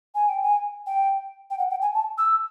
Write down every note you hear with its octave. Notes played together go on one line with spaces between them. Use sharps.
G#5
G5
G#5
G5
G5
F#5
G5
G#5
A5
E6